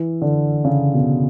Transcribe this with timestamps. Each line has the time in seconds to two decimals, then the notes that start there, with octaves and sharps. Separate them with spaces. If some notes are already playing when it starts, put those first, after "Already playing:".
Already playing: E3
0.22 D3
0.65 C#3
0.94 B2